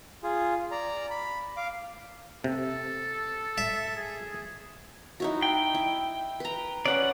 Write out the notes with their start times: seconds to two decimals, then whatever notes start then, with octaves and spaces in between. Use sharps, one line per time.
0.23 F4 G#4
0.71 D5 A#5
1.10 B5
1.57 F5 D6
2.44 C3 A4
3.58 E5
3.96 G#4
5.20 D#4 E4 F#4
5.42 G5
5.75 E4
6.40 B4 A#5
6.86 C#4 B4 D5 F#5